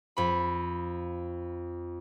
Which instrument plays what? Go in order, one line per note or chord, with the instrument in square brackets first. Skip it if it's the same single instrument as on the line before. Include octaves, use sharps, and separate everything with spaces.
[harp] F2 B5